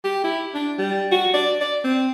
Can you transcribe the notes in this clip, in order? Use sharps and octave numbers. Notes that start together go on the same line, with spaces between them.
G4
E4
D4
G3
F#4
D5
D5
C4